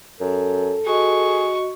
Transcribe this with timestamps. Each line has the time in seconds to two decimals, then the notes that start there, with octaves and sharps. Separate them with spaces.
0.20 F#2 A4
0.86 F#4 G#4 D#5 C#6